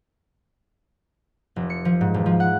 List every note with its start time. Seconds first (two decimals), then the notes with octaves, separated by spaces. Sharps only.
1.56 F1
1.70 C#7
1.85 F3
2.01 G#2
2.14 E1
2.26 F3
2.40 F#5